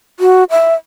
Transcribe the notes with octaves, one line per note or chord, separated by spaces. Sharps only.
F#4
E5